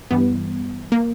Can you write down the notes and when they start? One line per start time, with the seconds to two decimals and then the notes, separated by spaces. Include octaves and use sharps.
0.11 G2 E3 G3 B3
0.92 A#3